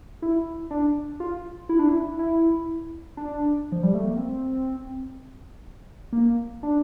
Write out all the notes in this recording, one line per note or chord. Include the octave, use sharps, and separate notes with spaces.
E4
D4
F4
E4
D4
E4
E4
D4
F3
G3
A3
A#3
C4
A#3
D4